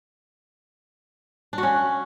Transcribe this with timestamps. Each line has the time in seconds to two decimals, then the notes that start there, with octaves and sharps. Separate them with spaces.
1.53 D4
1.58 F#4
1.63 C#4